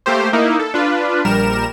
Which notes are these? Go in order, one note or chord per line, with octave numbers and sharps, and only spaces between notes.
A3 A#3 G4 C5
A#3 D#4 E4
A4
D4 F4 B4
A#1 G3 A#4 E7